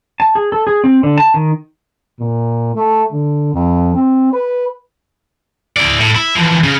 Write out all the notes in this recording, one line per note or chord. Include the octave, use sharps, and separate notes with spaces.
A5
G#4
A4
G#4
C4
D3
A5
D#3
A#2
A3
D3
F2
C4
B4
E4 D5
A2
E4
E3 F3
C#3